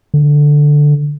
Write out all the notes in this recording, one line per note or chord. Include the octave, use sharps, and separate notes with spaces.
D3